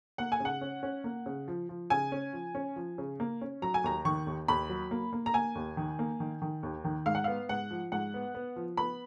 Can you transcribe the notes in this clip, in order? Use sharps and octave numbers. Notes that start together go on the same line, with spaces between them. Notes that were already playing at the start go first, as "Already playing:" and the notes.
A#3 F#5
G#5
C#3 F#5
C#4
C#4
A#3
C#3
F3
F3
C#3 G#5
C#4
F3
C#4
F3
C#3
A#3
C#4
F#3 A#5
G#5
D#2 A#5
D#3 C#6
D#2
D#2 B5
F#3
A#3
A#3
A#5
A#3 G#5
D#2
D#3
A#3
D#3
D#3
D#2
D#3
G#2 F5
F#5
B3 F5
G#2 F#5
F3
G#2 F#5
B3
B3
F3
B3 B5